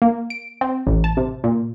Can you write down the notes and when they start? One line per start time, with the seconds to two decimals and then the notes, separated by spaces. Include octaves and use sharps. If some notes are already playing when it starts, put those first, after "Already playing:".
0.02 A#3
0.30 D7
0.61 C4
0.87 A1
1.04 A5
1.17 C3
1.44 A#2